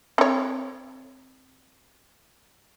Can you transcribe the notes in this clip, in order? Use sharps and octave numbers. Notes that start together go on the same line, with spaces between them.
C4 C#5